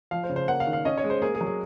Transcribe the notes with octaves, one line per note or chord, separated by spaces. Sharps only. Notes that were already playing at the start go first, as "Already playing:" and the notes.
F3 F5
C5
C#3
C5
A#3 F#5
F5
D#3
F5
C#4 D#5
C#5
G#3
C5
A#3 G#4
G#4
F#3
G#4